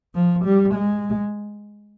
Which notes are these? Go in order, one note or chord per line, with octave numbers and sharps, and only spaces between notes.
F3
G3
G#3